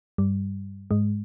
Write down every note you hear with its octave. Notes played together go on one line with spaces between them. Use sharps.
G2 G3
G#2 G#3